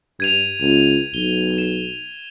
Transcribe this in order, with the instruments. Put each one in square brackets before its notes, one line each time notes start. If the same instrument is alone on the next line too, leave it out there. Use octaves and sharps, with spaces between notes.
[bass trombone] G2 [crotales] G#6 D#7 F7
[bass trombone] C#2
[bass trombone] B1 [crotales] G7
[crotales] E7